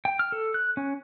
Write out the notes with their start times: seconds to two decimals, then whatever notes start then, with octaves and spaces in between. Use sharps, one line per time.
0.05 G5
0.19 F6
0.32 A4
0.54 F#6
0.77 C#4